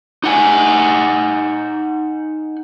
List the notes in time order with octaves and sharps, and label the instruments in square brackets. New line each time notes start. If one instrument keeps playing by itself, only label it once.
[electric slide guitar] D#4 F#5 G#5